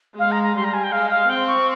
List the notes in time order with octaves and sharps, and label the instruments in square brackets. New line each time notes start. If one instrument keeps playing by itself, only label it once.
[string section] G#3 [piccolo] F5
[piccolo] A#5
A#5
[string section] G3 [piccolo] C6
[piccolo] A#5
G#5
G5
[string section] G#3 [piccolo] F5
[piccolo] F5
[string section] C4 [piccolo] G5
[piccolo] C#6